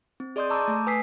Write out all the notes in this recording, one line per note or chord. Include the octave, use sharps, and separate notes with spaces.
C4
G#4 D5 D#5 C6 D#6 G6
A5 A#5 C#6 D6 E6 G6
A3
B4 G#5 D#6 E6 B6 C7